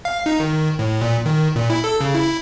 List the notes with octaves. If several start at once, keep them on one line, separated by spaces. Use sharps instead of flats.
F5
D#4
D#3
A2
A#2
D#3
A#2
E4
A4
C#3
E4